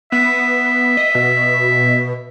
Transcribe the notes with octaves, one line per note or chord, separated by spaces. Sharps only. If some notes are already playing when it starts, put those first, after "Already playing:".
B3 E5
D#5
B2